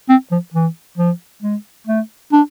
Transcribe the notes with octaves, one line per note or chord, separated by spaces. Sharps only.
C4
F3
E3
F3
G#3
A3
D4